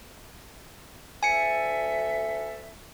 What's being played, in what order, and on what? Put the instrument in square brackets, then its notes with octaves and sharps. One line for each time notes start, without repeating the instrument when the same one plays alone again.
[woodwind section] D2 A4 E5 [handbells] G#5 C#7